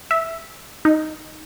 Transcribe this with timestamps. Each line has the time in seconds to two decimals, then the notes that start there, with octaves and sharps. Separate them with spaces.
0.11 E5
0.85 D#4